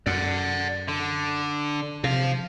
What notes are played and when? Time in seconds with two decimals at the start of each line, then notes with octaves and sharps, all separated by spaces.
0.06 F#2 D5 F#5
0.88 D3
2.04 C3 F3 F5